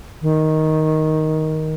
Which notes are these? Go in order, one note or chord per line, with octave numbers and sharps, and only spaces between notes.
D#3